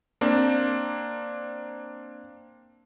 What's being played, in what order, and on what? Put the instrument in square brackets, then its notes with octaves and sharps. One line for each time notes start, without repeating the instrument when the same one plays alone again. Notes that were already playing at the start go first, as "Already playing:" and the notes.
[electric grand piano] A#3 C4 D4